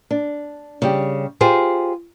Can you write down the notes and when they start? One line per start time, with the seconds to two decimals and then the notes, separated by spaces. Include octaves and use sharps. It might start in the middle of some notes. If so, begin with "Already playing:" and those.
0.11 D4
0.82 C#3 G3 G4
1.41 F4 G4 G#4 C5